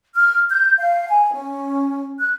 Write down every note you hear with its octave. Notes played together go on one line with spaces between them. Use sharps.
F6
G6
F5
G#5
C#4
F#6